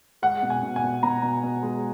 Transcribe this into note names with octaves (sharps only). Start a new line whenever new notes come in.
G#3 F#5
B2
G#5
B2
G#5
B2
B2 A#5
B2
B2
G#3